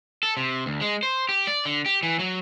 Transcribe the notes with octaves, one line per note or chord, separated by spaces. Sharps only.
A4
C3
D2
G#3
C5
G4
D5
D3
G4
E3
F#3